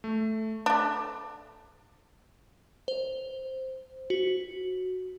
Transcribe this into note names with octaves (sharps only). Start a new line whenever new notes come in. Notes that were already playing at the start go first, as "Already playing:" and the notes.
A3
A3 D4
C5
F#4